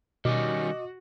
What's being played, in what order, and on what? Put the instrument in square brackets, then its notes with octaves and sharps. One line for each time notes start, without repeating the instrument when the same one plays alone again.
[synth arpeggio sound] B2 [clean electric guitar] D#3 G3 C#4 [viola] F#4 [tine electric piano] D#5 D6